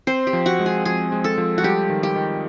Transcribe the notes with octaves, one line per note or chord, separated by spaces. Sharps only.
C4 C5
G4
F3
F#4
G#3
G#4
F3 G#4
G#3
A4
F3
F#4
G3 G4
D#3
G4
D#3